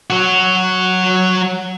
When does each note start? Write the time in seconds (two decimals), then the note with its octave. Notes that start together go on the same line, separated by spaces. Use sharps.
0.10 F#3 F#4